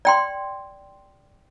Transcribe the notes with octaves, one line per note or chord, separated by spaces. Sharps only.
D5 G5 C6